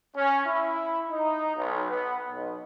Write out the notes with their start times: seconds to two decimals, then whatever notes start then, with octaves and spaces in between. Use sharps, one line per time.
0.16 C#4
0.47 E4
1.11 D#4
1.57 B1
1.90 B3
2.31 B1